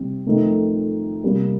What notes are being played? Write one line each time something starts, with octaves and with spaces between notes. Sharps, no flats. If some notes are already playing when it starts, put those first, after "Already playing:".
Already playing: C3 G3 C4
F2 D#3 A3 C4 D#4
C3 G3 A#3